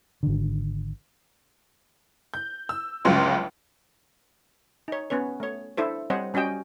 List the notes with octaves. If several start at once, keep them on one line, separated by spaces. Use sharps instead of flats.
G#1 D3
G6
E6
G1 C#2 C#3 F#3 F4 C6
D#4 C#5
B3 C#4 B4 C#5
A3 C#5
D4 E4 A4 C5
G3 C4 C5 C#5 D#5 F#5
G3 C#4 F#4 D#5 G5